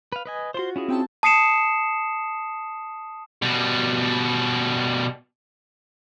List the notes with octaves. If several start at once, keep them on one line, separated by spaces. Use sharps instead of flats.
B4 F5
B4 D#5 G#5
F4 F#4 C5 C6
C#4 E4 G#4
C4 G5 A5
A5 D#6 C7 C#7 E7
B2 G3